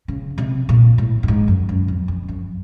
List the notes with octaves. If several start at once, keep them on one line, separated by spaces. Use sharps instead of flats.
C#3
C3
A#2
A2
G2
G#2
F#2
F#2
F2
F2
F#2